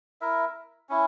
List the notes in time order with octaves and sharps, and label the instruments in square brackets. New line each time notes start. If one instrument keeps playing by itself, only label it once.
[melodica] E4 A#4 E5
C#4 E4